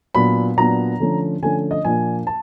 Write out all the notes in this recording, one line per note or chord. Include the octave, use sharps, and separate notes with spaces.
A#2 F#3 B3 D4 B5
A#2 F#3 B3 D4 A#5
D3 F3 A3 C#4
D3 F3 A3 C#4 G#5
D#5
A#2 F3 A#3 D4 G#5
A5